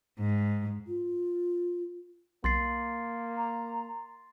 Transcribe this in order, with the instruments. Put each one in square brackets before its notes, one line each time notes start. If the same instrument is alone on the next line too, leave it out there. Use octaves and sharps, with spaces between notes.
[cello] G#2
[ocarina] F4
[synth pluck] B1 [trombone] A#3 [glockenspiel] C6 A6 C7
[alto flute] A#5